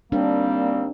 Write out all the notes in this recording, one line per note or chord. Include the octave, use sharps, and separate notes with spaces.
D#2 G3 A#3 C4 D4